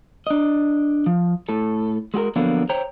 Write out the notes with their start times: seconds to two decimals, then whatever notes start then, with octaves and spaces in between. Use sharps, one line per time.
0.27 D4 D#5
1.06 F3
1.49 A2 A4
2.14 G#3 F#4 G4 A#4
2.36 D3 F3 F#3 A#3 B3
2.69 C5 C#5 G5 A#5